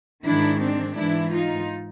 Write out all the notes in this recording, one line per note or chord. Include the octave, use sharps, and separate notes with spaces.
G#2 D#3 D4 E4
C4 D4
G#2 E3 D4 E4
D#4 F4